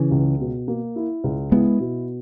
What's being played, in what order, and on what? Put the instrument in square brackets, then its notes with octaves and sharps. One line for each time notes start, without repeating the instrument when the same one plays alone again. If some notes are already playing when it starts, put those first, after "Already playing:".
Already playing: [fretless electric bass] C#3 E3
[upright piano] C#2
B2
A#3
E4
C#2
[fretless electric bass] G#3 B3 [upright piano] E4
[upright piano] B2